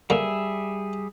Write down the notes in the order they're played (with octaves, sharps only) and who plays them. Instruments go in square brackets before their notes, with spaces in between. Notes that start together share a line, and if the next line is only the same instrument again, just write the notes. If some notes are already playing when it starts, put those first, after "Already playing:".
[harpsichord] D3 A#3 [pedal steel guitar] G3 G#4 E5